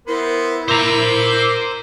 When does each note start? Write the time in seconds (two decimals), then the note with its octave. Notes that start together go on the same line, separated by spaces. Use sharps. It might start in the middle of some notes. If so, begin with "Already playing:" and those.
0.08 B3 E4 A#4 C5
0.68 A#4 C5 A#5 D6 E6